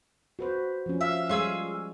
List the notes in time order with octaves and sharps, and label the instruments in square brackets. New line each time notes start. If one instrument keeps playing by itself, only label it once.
[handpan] F#4 B4 C5
F3 C#4
[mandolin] E5 [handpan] F5
[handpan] G3 G#3 C#5 [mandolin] F4 G#4 E6